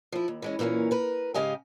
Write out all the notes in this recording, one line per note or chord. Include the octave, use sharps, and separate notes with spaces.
F3 E4
D#2
E3 G#3 C#4
A#2 E3 A#3 C4 C#4
A#4 B4
G#2 C#3 G4 D#5 F5 G#5